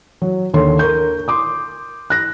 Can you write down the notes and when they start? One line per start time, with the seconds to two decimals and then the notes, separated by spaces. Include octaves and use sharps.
0.22 F#3
0.54 D#2 D3 A4 C#5 C6
0.79 A#4 C#6 G6
1.28 C6 D6 D#6
2.10 F#6 A#6